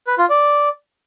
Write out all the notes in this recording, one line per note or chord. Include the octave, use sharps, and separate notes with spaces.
B4
F4
D5